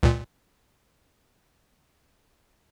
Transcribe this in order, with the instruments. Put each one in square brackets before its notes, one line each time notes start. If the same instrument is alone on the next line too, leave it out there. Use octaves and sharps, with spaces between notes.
[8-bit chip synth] C#2 A#2